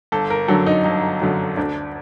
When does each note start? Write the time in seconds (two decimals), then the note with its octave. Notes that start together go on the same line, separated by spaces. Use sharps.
0.12 G1 A4
0.30 A#4
0.48 F#2 D3 F#3 A4
0.66 D#4
0.84 G1 D#4
1.21 F#2 D3 F#3
1.57 D2 D4